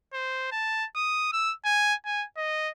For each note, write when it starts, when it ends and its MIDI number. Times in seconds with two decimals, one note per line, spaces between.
0.14 0.51 72
0.52 0.86 81
0.96 1.28 87
1.33 1.53 88
1.65 1.94 80
2.06 2.25 80
2.37 2.70 75